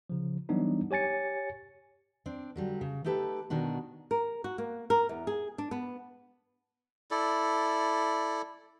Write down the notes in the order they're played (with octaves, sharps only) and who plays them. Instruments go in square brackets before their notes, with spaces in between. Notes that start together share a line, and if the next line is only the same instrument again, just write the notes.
[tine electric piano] C#3 F3
E3 F#3 G3 B3 D4 D#4
G4 C#5 G#5 A6 C#7
[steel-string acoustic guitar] C4 D4
D3 F#3 G3
C#3
A3 D#4 G4 A4 B4
B2 D#3 D4 F#4
[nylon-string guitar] A#4
F#4
A#3
A#4
E2
G#4
D4
B3
[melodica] E4 A4 D5